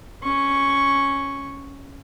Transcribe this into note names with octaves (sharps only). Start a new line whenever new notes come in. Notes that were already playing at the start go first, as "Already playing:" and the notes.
C#4 C#6